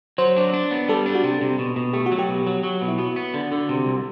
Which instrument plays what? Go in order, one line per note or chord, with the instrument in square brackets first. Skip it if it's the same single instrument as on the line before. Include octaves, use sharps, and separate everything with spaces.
[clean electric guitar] F#3 [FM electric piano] C5
[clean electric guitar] D4
D4
B3
[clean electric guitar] G3 [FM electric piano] A4
[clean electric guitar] D4
[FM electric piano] F#4
[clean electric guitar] C3 [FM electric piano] G4
[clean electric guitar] C3
B2
B2
[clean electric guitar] A3 [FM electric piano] G4
[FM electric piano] F#4
[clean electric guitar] F#3
[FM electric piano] G4
[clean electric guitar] B2
F#3
F#3
B2
[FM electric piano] E4
[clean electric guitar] B3 [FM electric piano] F#4
[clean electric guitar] B3
D3
D3
C3
C2